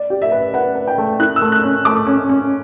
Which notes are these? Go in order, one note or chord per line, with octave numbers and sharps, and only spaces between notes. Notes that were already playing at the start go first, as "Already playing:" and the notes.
Already playing: D5
G4
E5
B4
B4 F#5
B4
G5
A3
E4 F#6
E6
A3
F#6
C#4
A3 D6
C#4
C#4